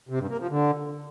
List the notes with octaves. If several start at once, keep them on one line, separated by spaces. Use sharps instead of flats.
C3
G2
A#3
F3
D3